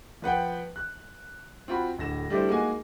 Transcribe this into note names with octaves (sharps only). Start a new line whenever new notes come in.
F3 B4 F#5 G5
F#6
C4 F4 F#4 B5
D1 D3 A#6 E7
G3 A3 D4 E4 C5
G#3 A#3 D#4 F#4 G#5